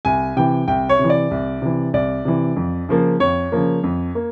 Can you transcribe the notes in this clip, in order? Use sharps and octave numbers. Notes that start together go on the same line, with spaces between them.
C2 G#5
C3 E3 G5
C2 G5
C#5
C3
E3
D5
C2
C3 E3
C2 D5
C3 E3
F2
C#3 F3 A#3
F2 C#5
C#3 F3 A#3
F2
A#3